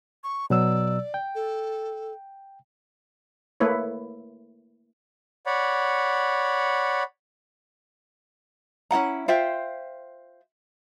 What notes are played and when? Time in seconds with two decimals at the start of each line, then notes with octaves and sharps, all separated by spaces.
0.24 C#6
0.50 B2 F#3 D5 E6
1.14 G5
1.35 A4
3.60 A3 A#3 E4 B4 C#5
5.46 C#5 D5 F#5 B5
8.91 C#4 E4 F#5 A#5
9.28 F4 C5 E5 G5